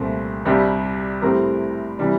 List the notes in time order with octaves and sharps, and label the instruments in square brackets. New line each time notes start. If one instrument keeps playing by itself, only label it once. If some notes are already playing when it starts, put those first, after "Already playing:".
Already playing: [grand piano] C2 A#2 A3 C4
C2 C3 G3 D4 G4
A2 G3 C4 G4 A#4
C3 E3 G3 D4